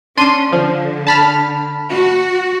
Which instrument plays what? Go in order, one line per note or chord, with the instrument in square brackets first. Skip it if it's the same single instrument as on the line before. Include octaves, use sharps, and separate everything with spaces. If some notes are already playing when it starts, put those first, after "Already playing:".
[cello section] C#4 [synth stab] D4 C6 D#7
[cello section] D3 [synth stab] F3
[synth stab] A5 B5 F6
[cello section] F#4